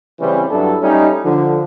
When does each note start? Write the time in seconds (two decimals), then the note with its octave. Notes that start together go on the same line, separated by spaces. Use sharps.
0.19 C#3 E3 G3 C4 C#4
0.50 G2 F#3 D4 E4 A4
0.82 G3 A3 C#4 D#4
1.23 D3 F3